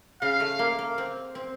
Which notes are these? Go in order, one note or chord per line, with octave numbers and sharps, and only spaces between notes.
C#3 F5
A3
A#3
A#3
C4
C4